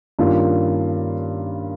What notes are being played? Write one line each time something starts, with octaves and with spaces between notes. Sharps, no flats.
G2 D#3 A#3 C#4 F4